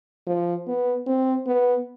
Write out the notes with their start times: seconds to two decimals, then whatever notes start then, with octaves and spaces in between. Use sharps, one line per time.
0.27 F3
0.68 B3
1.07 C4
1.47 B3